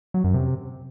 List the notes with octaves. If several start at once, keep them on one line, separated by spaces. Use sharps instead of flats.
F#3
F#2
C3